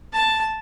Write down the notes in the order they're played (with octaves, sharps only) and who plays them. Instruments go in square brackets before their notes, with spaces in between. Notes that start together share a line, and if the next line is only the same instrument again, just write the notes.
[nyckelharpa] A5